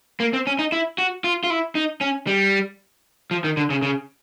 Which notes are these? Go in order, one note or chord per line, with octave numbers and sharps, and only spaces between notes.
A#3
C4
C#4
D#4
E4
F#4
F4
F4
E4
D#4
C#4
G3
F3
D#3
D3
C#3
C#3